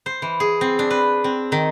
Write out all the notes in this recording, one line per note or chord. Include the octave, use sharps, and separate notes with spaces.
C5
E3
G#4
C4
D4
B4
C4
D#3